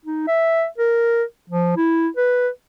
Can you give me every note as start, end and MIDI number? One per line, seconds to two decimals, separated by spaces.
0.05 0.26 63
0.27 0.65 76
0.78 1.23 70
1.50 1.76 53
1.77 2.08 64
2.17 2.48 71